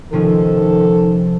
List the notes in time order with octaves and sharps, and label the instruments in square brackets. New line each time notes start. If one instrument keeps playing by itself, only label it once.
[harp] C3 F3 C#4 [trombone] D#3 [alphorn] A4